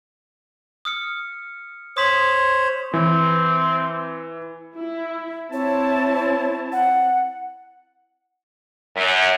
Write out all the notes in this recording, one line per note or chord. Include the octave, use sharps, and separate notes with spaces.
D#6 F6 C#7
C5 C#5 D#6 B6 F#7
E3 C4
E4
C4 E4 C#5 A5
F#5
F#2